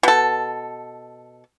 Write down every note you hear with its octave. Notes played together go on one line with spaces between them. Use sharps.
B2 A4